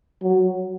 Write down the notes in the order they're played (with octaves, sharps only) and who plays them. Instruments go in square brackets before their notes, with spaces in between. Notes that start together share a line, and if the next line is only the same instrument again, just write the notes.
[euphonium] F#3